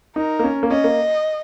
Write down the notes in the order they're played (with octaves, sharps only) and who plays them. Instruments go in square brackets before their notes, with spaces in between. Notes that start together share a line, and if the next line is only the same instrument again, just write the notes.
[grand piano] D#4 [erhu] A#4
[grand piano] A#3
C#4
A#3
[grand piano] C#4 [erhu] D#5
[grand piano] A#3